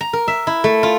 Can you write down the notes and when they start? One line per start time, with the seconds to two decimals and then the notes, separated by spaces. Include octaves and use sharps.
0.01 A#5
0.13 A#4
0.28 E5
0.47 E4
0.64 A3
0.83 F4